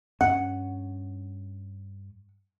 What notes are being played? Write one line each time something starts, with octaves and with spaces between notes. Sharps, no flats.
G2 C#4 F#5